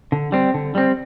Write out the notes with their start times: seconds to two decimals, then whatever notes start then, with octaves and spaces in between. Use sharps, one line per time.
0.12 D3
0.32 G3 C4
0.54 D3
0.75 G3 C4